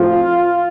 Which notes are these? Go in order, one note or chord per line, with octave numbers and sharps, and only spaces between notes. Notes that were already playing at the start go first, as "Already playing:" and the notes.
Already playing: A2 F3 C4 F4